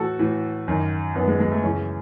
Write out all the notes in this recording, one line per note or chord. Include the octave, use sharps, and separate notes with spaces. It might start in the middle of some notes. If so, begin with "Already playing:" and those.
Already playing: A2 E3 F#4 A4
A2 E3
F#2 D#3
F#2 D#3 B3
G#3
G#3
A3
F#2 C#3 E3 C#4